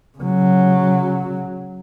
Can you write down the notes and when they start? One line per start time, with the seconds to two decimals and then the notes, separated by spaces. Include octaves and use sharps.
0.19 C#3 F#3